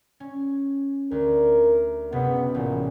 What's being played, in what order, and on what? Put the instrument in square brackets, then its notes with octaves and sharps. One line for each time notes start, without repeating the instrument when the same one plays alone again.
[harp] C#4
[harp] D2 [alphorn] A#4
[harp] F#1 C3 A3 [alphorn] B3
[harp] A1 [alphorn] A#2